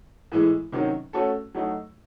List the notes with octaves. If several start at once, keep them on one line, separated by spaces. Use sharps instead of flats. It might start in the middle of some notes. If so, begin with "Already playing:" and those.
A2 E3 G#3
C3 D#3 F#3 C#4
A3 C#4 F#4 A4
F#3 A3 D#4